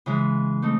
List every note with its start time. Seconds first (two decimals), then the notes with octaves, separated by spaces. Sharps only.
0.06 C#3 E3 G#3
0.62 A3 C4 D#4